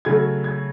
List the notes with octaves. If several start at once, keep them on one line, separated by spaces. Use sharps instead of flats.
C#3 F#3 A3 G#6
G#6